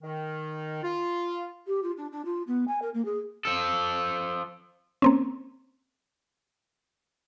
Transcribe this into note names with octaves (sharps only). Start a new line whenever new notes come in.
D#3
F4
G4
F4
D4
D4
F4
B3
G#5
A#4
A#3
G#4
F3 A4
A#3 C4 C#4